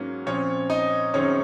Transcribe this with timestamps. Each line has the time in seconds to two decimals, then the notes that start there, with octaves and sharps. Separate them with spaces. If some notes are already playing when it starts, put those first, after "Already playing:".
Already playing: G#2 F#3 A#3 C#4
0.26 A#2 F3 C4 C#4 C#5
0.70 D#4 D#5
1.14 F#2 D#3 G#3 C4 C#4 C#5